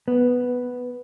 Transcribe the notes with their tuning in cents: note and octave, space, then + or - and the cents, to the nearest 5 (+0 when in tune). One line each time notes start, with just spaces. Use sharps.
B3 +0